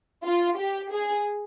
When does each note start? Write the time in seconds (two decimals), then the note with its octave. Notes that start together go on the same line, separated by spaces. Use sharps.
0.25 F4
0.58 G4
0.92 G#4